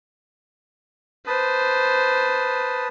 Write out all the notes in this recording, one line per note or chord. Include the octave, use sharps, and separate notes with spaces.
B4 C5 A5 D#6